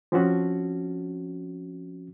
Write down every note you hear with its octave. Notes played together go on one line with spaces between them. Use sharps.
F3 C4 C#4 F#4